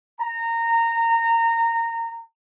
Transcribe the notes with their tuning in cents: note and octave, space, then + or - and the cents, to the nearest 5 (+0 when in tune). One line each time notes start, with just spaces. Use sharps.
A#5 -20